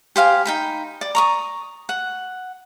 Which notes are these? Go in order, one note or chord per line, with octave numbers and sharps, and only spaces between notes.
G4 C5 F5 G#5
D#4 G5 B5
D5
A#5 C#6 D#6
F#5